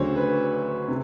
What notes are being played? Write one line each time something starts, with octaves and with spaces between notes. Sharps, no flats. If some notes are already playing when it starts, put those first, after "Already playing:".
Already playing: D2 C#3 F#3 A3 D4 C5 C#5
B4
C3